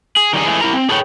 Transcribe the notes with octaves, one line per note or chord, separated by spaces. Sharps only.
G#4
D#3 G3 D#4 G#4
E3 G#3 A3 G#4
E4 A#4 A#5
C4
G#4 A4 B4 C#5 G5